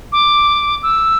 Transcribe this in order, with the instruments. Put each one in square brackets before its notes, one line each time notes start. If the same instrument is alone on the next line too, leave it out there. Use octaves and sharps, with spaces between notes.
[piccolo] D6
E6